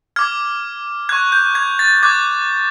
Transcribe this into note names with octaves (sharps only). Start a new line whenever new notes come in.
D6 F6 G#6
C#6 F#6 G#6
G6
G#6
A6
D6 F#6 G#6